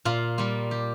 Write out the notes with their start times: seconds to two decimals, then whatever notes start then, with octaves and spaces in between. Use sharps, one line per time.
0.05 A#2 F4
0.38 G3 A#3 F4
0.71 G4